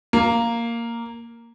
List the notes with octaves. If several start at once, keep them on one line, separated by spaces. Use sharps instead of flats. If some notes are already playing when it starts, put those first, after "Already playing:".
A#3